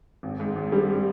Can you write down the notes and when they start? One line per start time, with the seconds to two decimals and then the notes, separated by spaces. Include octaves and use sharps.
0.23 G#1
0.40 G#2
0.56 G#1
0.72 G3